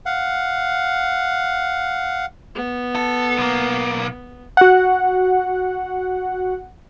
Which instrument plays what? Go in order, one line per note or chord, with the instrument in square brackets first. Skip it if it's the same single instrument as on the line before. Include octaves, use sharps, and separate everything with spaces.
[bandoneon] F5 F#5
[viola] B3
[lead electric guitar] A4
B1 A#3
[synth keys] F#4 F#5